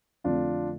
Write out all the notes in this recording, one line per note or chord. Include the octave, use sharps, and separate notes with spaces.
F2 D3 A3 C4 D4 F4